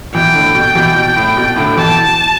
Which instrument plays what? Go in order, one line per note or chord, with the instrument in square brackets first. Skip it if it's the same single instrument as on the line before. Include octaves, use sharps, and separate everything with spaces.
[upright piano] B2 E3 [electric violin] G5
[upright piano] A2 D3
B2
B2 E3
B2
A2
B2
A2 D3
[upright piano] B2 E3 [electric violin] A5